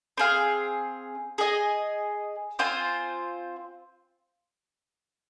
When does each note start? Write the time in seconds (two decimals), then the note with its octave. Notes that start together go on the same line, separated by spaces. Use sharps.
0.18 C4 G#4 F5
1.38 G#4 D#5 G#5
2.59 C4 F4 C5 G#5